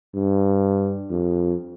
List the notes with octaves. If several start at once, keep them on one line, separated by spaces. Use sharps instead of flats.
G2
F2